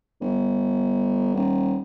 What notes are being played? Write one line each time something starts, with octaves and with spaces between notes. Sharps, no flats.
G1
D#1